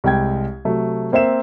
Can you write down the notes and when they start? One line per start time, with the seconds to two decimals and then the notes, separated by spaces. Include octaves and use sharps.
0.04 C2 G#3 G5 G#6
0.65 C3 F#3 A3 A4
1.12 A#3 C4 C5 E5 E7